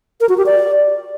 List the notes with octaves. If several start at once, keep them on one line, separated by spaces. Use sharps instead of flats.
A#4
F#4
G4
D5